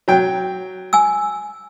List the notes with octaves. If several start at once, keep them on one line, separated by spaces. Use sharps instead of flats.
F#3 G5
G#5 E6